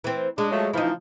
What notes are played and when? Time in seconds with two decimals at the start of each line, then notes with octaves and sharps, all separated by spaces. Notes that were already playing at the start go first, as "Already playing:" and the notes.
0.04 E3 C4
0.38 G#3 D4
0.52 F3 F#3 A3
0.73 C#3 E3 F3 D#4 E4